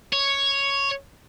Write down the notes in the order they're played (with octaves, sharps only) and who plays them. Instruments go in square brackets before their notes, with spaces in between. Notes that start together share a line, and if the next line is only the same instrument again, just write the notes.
[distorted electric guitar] C#5